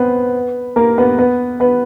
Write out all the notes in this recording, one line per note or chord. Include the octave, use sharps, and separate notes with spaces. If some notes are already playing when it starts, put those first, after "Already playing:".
Already playing: B3 C4 B4
A#3 A#4
B3 B4
B3 B4
B3 B4